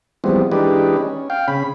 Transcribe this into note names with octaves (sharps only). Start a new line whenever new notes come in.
E3 F3 G3 G#3 B3 C4
E3 G#3 D4 D#4 G4 B4
C#4
F5 G5
C#3 C#4 B5